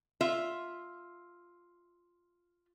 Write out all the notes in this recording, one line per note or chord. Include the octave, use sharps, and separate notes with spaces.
F4 E5